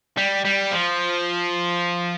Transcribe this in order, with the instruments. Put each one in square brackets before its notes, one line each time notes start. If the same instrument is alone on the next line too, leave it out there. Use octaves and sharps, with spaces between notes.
[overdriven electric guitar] G3
G3
F3